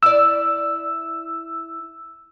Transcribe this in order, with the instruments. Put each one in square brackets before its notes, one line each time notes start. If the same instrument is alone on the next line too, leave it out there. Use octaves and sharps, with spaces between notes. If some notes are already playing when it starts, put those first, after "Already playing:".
[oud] E4 D5 [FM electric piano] E6